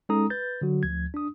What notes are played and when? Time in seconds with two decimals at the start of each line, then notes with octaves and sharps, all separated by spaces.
0.09 G#3 C#4 D#4 A4 A#5 D#6
0.30 B4 G6 A6
0.61 D3 F#3 F#4
0.83 D2 F3 G#6
1.14 D4 D#6